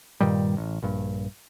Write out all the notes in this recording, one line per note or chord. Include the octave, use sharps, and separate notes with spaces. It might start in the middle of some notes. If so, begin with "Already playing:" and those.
G2 A#2 D#3 G3
A1
A#1 G2